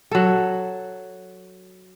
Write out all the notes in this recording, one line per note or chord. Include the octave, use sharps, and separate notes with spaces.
F#3 A4